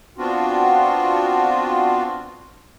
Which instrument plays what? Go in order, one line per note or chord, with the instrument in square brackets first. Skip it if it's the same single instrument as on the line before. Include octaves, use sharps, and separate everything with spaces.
[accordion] B3 C4 D4 F4 F#4